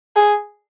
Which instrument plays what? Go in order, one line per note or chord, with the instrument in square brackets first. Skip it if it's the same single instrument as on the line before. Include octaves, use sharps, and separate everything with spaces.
[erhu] G#4